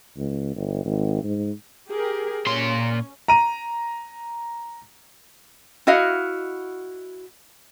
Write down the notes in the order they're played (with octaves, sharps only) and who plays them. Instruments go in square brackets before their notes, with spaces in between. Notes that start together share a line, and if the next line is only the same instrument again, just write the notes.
[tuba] C#2
G1
G#1
G#2
[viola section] G4 G#4 A#4
[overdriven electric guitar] A#2 C6 [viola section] C#4
[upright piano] A#5 D#7
[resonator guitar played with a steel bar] E4 F#4 D#5 F5 F#5